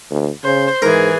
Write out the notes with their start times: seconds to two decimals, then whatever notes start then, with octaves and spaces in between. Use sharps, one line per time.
0.11 D2
0.44 C#3 C5
0.82 G#2 E3 G#4 A#4